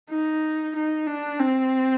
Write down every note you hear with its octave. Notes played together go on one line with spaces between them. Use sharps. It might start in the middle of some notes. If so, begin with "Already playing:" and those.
D#4
D#4
D4
C4